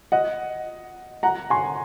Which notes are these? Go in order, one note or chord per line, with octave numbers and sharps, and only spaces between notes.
D#5 F#5
F#5 A#5
G#5 C6